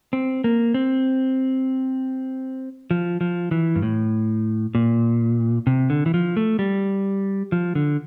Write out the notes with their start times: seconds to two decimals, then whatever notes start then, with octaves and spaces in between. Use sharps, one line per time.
0.13 C4
0.44 A#3
0.74 C4
2.91 F3
3.21 F3
3.51 E3
3.76 G2
3.82 A2
4.75 A#2
5.67 C3
5.90 D3
6.06 E3
6.14 F3
6.37 A3
6.59 G3
7.52 F3
7.75 D3